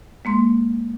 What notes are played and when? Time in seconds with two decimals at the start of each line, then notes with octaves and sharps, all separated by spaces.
0.25 G#3 A#3 C6